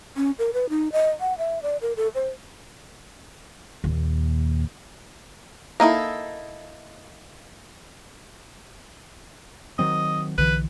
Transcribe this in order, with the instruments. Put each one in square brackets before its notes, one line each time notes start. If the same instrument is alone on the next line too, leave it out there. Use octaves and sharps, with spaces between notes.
[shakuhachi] C#4
A#4
B4
D#4
D#5
F#5
E5
D5
A#4
A4
C5
[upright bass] D#2 A#2
[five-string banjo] A#3 D#4 E4 A4
[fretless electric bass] D#3 F#3 C4 [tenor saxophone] D#5
[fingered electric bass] B1 D3 E3 [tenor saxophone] B4